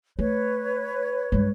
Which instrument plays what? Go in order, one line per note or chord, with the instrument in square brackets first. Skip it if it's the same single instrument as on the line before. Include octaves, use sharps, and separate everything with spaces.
[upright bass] A3 [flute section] B4 C#5
[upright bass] G2 G#3